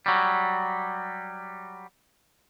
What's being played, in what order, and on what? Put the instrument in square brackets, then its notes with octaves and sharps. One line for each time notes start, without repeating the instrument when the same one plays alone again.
[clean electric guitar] F#3 G3